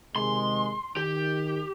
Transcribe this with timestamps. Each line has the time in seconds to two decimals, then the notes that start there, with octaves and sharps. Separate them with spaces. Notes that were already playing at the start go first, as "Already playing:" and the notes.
0.16 C3 D#3 G#3 C6
0.97 D#3 G4